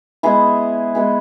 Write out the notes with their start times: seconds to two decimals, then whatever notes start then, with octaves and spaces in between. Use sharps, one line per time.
0.23 G#3 B3 E4 G#4
0.95 G#3 B3 E4 G#4